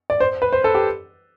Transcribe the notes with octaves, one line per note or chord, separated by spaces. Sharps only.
D5
C5
B4
C5
A4
G4